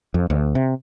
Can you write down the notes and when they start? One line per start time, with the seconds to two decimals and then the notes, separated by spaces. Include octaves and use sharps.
0.14 F2
0.30 D2
0.55 C3